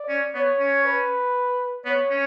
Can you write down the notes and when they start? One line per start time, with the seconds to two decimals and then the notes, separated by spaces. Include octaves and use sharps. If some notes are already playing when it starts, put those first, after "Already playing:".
Already playing: D5
0.09 C#4
0.34 B3 C#5
0.59 C#4
0.84 B4
1.85 B3 C#5
2.11 C#4